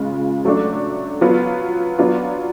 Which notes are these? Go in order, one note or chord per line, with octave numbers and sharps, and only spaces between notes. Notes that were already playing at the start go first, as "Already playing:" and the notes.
Already playing: C#3 G#3 F4
F#3 A3 D4
F#3 B3 F4
F#3 B3 D4 F4